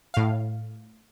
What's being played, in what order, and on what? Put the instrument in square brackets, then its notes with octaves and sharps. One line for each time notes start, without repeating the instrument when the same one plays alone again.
[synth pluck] A2 F5